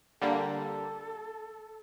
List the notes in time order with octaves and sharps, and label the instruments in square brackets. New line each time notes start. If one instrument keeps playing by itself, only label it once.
[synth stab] D3 G3 A#3 [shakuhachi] A4